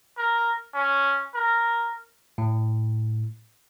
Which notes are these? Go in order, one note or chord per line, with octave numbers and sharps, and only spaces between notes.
A#4
C#4
A#4
A2